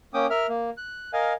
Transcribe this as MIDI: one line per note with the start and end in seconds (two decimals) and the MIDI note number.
0.14 0.26 58
0.14 0.26 61
0.14 0.26 79
0.14 0.26 86
0.14 0.26 87
0.30 0.47 70
0.30 0.47 76
0.30 0.47 89
0.49 0.70 58
0.77 1.11 90
1.13 1.33 70
1.13 1.33 75
1.13 1.33 77
1.13 1.33 80